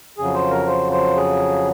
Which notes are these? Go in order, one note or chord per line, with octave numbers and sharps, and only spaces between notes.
F2 C#3 F#3 G#4
C5
A#4
C5
C5
G#4